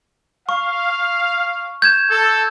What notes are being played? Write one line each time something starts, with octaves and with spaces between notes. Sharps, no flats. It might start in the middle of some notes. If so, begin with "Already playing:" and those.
F5 C#6
G6 G#6 E7
A4